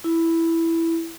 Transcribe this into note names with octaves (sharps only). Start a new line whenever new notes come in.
E4